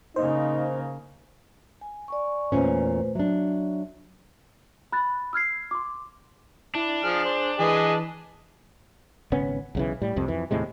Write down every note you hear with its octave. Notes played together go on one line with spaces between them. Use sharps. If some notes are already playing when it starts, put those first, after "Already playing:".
C#3 A#3 D#4 C5
G#5
D5 G#5 C#6
E2 A#2 A3 C#4 B4 C5
F#3 D4 E5
B5 F#6 A6
E6 F6 G#6 C7
C6 D6
D4 E4
F3 G#4 F6
C5
E3 G#4 B4 D#5
G#1 C#3 B3 C#4
B1 C#3 E3
A2 G3
C2 F2 C3
F2 E3
D#2 A2 C3 G#3